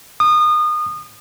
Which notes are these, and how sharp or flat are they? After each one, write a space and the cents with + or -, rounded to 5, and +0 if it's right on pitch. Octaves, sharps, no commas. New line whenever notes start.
D#6 -30